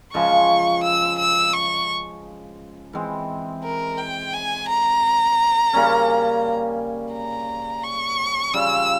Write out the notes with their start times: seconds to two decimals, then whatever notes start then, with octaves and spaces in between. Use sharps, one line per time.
0.14 C#3 F3 G#3 C#6
0.84 E6
1.19 E6
1.53 C#6
2.93 E3 G#3 C4
3.64 A#4
3.98 G5
4.33 G#5
4.69 A#5
5.73 C#3 G3 A#3 C#4
7.13 A#5
7.84 C#6
8.53 C#3 G3 C#4 F4 E6